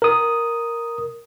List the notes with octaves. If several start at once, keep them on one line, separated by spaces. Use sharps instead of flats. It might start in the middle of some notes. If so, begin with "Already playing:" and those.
A#4 D#6